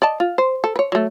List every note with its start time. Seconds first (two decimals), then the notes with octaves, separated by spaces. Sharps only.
0.02 D5 D#5 A5
0.20 F4
0.38 C5
0.64 A4
0.76 B4 C#5
0.92 F#3 A3